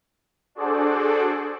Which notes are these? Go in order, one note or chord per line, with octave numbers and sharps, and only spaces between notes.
D4 F#4 G#4 A4 C5 D5